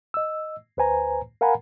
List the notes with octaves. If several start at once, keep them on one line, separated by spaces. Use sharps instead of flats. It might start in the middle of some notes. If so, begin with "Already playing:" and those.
D#5 E6
D2 B4 C5 G#5 A#5
A#4 F5 F#5 G#5 A#5 B5